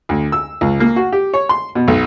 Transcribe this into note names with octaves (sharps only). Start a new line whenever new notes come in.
D2
E6
C#2
A#3
F#4
G4
C#5
C6
B2
B1